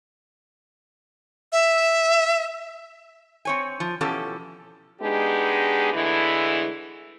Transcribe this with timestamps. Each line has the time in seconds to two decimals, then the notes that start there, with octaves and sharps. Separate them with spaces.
1.52 E5
3.45 C4 C#5 G#5
3.80 F3
4.01 B2 E3 F3 C#4 G4 A4
5.01 G#3 B3 D4 D#4 G4 G#4
5.93 D3 E3 G#3 A3 E4